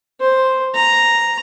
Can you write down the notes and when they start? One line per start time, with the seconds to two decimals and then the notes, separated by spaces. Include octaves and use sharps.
0.20 C5
0.74 A#5